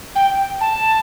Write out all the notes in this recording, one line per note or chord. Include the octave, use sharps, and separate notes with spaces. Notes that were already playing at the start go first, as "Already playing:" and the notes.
G5
A5